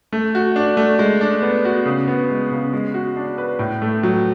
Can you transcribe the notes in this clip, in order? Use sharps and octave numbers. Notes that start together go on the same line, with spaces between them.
A3
F#4
D4
A3
G#3
D4
B3
F#4
C#3
B3
G#3
C#3
G#3
F#4
D4
B4
A2
A3
F#3